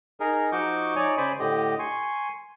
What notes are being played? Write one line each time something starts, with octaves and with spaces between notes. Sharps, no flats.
D#4 G#4 A#4
F3 D#4 F#4 C#6 D6 G6
D#4 C#5 D5 G#5
C#3 C5 D5 G#5 B5
A2 D3 G4 D#5
G#5 C6 C#6